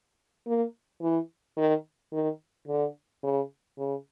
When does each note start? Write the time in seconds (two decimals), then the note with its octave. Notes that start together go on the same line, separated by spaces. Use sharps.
0.47 A#3
1.02 E3
1.57 D#3
2.13 D#3
2.68 D3
3.23 C#3
3.78 C#3